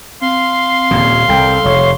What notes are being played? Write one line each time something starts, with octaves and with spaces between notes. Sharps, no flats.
C4 F5 C6
D#1 A#2 C#3
C2 A4 G5
F1 C#5